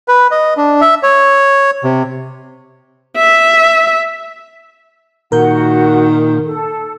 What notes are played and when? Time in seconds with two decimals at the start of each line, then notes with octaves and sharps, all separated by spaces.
0.08 B4
0.31 D#5
0.57 D4
0.81 E5
1.03 C#5
1.84 C3
3.17 E5
5.32 A#2 D#3 F#4 A#4 F#5 G6
6.46 A4